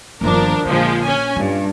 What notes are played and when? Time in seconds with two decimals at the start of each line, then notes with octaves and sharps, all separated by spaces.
0.21 G1 D#2 F3 D4 A#4
0.65 A#1 D3 F3 G#3
1.03 C#4 G#5
1.36 G2 F4